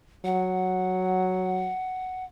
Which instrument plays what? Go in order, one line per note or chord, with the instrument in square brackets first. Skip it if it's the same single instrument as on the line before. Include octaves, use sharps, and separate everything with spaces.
[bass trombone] F#3 [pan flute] F#5